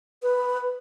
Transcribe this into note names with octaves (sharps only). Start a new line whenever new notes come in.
B4